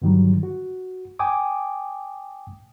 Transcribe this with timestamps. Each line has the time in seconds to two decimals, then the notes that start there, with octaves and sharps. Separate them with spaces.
0.02 G2 D3 D#3 F#3 G3
0.43 F#4
1.19 G5 G#5 D6 D#6